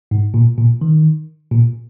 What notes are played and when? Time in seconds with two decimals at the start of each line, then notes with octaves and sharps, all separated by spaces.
0.11 G#2
0.34 A#2
0.58 A#2
0.81 D#3
1.51 A#2